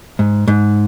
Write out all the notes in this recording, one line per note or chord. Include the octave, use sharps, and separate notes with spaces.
G#2
G#2